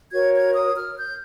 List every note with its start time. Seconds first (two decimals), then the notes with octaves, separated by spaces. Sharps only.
0.12 F#4 A#4 C#5 G#6
0.34 G#6
0.54 D#6
0.76 F6
0.97 G6